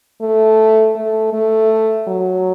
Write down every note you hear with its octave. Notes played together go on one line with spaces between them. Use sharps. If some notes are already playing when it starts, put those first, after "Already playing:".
A3
A3
A3
F#3